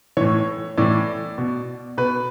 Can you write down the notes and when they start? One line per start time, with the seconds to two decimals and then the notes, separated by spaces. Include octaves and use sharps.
0.17 A2 E3 C#5
0.77 A2 E3 D5
1.38 B2
1.98 B2 B4